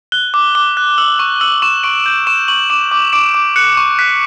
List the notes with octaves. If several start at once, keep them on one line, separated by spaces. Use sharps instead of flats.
F#6 G7
D6
D6 G7
F#6
E6 F#7
C#6
E6 F#7
C#6 E7
C#6 D7
G6
C#6 E7
C#6 F#7
D6 E7
D6
D6 D7
D6
F#6 C#7
C#6
F#6 B6